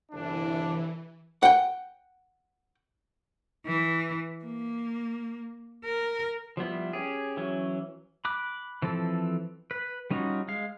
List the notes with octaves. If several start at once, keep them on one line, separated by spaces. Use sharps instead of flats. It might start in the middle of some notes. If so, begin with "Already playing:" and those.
G1 C2 E3 D4
F#5 G5
E3
A#3
A#4
F3 G3 B3 E4
C#4 G4 G#4
E3 F#3 C#4
B5 D6 F#6
E3 F3 C4 A4
B4
G3 C#4 D#4 F4 F#4
G#3 F5